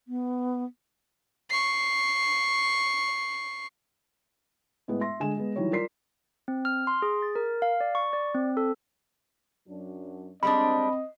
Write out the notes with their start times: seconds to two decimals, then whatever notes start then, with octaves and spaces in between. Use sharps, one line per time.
0.08 B3
1.50 C#6 C7
4.88 A2 G#3 B3
5.01 E5 C6 A#6
5.20 D3 G#3 G#5 E7
5.37 G#3 B3
5.56 D#3 E3 F#3 G3 C#5
5.72 F4 A#4 D5 C6 B6 C7
6.48 C4
6.65 F6
6.87 C6
7.02 G#4
7.22 A6
7.36 A#4
7.62 F5
7.81 D5
7.95 C#6
8.13 D5
8.35 C4
8.57 A4
9.68 F#2 F#3 D4
10.43 G3 G#3 C4 D4 D#5 B5